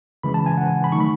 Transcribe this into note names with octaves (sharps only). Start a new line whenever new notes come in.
C#3 E3 G#3 B5
A5
G#5
F#5
G#5
B5
D#3 F#3 A3 D#4 C#6
B5